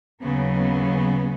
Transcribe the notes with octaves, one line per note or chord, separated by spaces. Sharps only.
D#2 C#3 F#3 B3